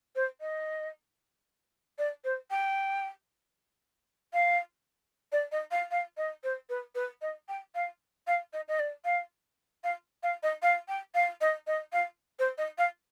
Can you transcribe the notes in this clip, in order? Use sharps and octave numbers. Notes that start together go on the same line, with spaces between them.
C5
D#5
D5
C5
G5
F5
D5
D#5
F5
F5
D#5
C5
B4
B4
D#5
G5
F5
F5
D#5
D#5
D5
F5
F5
F5
D#5
F5
G5
F5
D#5
D#5
F5
C5
D#5
F5